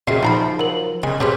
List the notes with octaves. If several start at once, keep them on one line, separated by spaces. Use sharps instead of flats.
A#2 C#3 C4 F#4 D#5 E5 C7
F3 D#4 C5 A#5 B5
F#3 A#4 F#7
C#3 G#3 G#5
A#2 C#3 C#4 G4 B4 C5